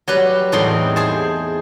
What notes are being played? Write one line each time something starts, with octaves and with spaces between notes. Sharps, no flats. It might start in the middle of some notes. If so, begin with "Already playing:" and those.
F#3 G3 G4 B4
E2 A2 G3 C4 D#4 C6
G#4 C5 A5